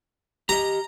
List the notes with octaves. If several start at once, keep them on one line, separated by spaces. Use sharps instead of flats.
G4 D#5 A#5